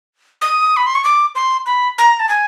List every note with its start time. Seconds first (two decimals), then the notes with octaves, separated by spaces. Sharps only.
0.41 D#6
0.77 B5
0.87 C6
0.95 C#6
1.04 D6
1.35 C6
1.66 B5
1.98 A#5
2.20 A5
2.29 G#5